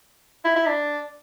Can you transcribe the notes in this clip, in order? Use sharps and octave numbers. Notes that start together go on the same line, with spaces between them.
E4
E4
D4